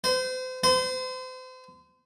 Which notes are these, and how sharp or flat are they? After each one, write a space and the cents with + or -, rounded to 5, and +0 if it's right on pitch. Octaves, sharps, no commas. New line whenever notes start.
C5 -35
C5 -35